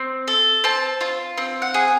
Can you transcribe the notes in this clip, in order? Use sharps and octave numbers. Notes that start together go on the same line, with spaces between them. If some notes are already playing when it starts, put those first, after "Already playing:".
Already playing: C4
A4
C4 A5
F4
C4
F#5
G#4